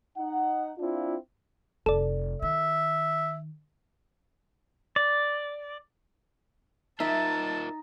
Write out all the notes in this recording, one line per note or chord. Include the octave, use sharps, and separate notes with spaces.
D#4 F#5
C4 D4 E4 F4
F1 A4 D5
D#3 E5
D5
G3 D#4 F4 A#4 D#5 E5 A5